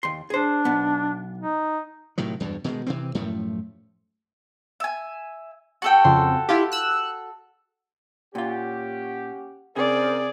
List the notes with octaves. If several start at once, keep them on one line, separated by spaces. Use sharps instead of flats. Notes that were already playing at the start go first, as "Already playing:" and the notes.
D#2 C6
D4 G#4 C5
B1 B3
D#4
A2 C3 D#3 F#3
E2 G2 B2
B2 D#3 G3 G#3
C3 E3 C4
F#2 A2 F3 A3
E5 G#5
F#4 A4 G5
F2 C#3 C5
E4 F4 G4
E6 F#6
A#2 C#4 F4 G4 F#5
C3 C#4 G#4 A#4 C5 D5